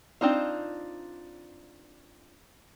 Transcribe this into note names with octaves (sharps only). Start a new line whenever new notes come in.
C4 D4 D#4 F4